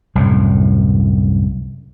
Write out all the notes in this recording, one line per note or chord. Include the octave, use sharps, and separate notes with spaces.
C2 F#2 A2